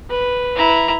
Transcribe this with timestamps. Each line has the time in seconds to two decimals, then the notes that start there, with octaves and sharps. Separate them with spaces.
0.10 B4
0.56 E4 A#5